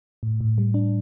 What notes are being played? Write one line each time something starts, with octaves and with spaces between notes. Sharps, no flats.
A2
A2
G3
D4